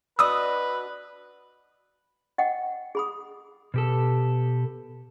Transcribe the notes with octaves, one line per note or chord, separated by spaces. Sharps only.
D4 F#4 B4 D#5 D#6 E6
D#5 F#5 G5
G#4 B5 D#6
B2 G4 A4